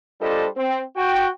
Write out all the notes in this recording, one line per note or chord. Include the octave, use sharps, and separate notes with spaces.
G3 D4 F4 A4 C5 D#5
C4
F#4 G5